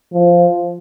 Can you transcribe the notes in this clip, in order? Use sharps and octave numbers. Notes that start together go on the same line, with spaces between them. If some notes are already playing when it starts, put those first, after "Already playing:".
F3